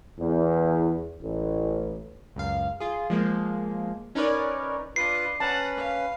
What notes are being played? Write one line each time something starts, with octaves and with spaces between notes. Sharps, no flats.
E2
A1
C#2 F#2 F5
F4 G#4
F3 G#3 A#3
C#4 D#4 A#4 B4 C#5 D5
D4 F4 B4 D#5 C7
C#4 B4 F#5 A5 A#5
F5